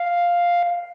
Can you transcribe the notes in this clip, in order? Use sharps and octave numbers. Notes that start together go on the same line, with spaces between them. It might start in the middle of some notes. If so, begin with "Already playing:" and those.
Already playing: F5